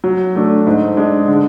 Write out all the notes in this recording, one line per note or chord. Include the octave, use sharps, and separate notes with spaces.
F#3
A3 D4
G#2
G#3 D4
D3